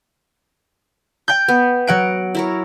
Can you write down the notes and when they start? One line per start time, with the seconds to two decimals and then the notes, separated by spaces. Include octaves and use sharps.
1.28 G5 G6
1.48 B3
1.87 F#3 F#5 D7
2.35 E4 A#4 C#5